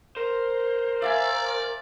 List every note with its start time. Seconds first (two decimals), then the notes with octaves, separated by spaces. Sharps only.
0.16 A#4 C5
1.02 D5 E5 F5 G#5